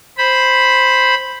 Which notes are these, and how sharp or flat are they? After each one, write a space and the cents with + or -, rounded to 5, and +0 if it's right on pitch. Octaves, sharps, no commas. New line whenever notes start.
C5 +0 B5 +0